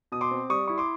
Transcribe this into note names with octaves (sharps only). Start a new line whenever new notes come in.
B2 D#6
C6 D6
C4
G3 C#6 D#6
E4 C#6
C6 D6